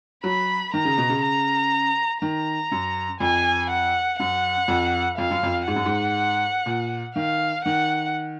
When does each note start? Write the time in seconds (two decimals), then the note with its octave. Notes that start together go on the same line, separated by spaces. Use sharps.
0.24 F#3 B5
0.74 D#3 A#5
0.85 C#3
0.98 B2
1.09 C#3
1.23 A#5
2.22 D#3 A#5
2.72 F#2
3.20 F2 G#5
3.70 F#5
4.19 F#2 F#5
4.68 F2
5.18 F2 F5
5.31 F#2
5.43 F2
5.68 G#2 F#5
5.76 F#2
5.86 G#2
6.66 A#2
7.16 D#3 F5
7.65 D#3 F#5